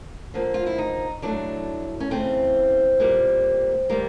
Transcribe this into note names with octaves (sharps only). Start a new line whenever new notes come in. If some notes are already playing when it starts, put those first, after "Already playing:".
D3 F3 A#3
F4
E4
D#4
A2 F#3 A3 D4
C#4
C#3 E3 A3 C4
A#2 G3 A#3
D#3 G3 A#3